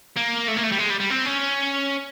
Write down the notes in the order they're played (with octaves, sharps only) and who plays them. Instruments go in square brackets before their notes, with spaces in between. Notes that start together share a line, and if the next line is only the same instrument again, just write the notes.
[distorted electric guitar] A#3
A3
A#3
A3
G3
G#3
G3
G3
C4
C#4